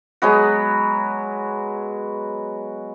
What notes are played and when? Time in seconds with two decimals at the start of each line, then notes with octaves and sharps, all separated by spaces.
0.22 F#3 G#3 B3 F#4